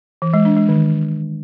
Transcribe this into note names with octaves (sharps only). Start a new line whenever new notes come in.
E3
G#3
D4
G#3
D#3